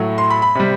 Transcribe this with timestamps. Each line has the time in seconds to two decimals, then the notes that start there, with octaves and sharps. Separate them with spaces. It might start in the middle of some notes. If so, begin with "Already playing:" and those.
Already playing: A2 F#3 A3
0.18 C6
0.31 B5
0.42 B5
0.55 C3 G3